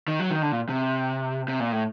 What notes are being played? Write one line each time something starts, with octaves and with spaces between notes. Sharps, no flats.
D#3
F#3
D#3
D3
A#2
C3
C3
A#2
A2